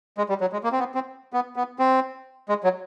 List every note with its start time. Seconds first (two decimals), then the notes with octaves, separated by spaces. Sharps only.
0.18 G#3
0.29 G3
0.41 F#3
0.53 G#3
0.64 A#3
0.72 C4
0.79 B3
0.95 C4
1.33 B3
1.56 B3
1.79 C4
2.49 G#3
2.64 F#3